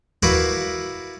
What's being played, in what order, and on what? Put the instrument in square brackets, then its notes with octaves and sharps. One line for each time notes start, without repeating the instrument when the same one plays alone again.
[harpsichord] E4 F#4 A#4 B4 D5 F5